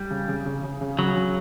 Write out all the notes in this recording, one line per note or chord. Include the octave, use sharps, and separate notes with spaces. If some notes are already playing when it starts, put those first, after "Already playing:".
Already playing: G3
C#3
C#3
C#3
C#3
C#3
C#3 F#3
C#3